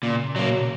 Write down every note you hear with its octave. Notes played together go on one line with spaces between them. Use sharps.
A#2 C#3
A#2 F#3 A#3
B2
A#2